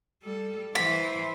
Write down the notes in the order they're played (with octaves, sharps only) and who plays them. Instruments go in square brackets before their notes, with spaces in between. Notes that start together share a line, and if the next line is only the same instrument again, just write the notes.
[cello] G3 A4
[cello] E3 C5 [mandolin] B5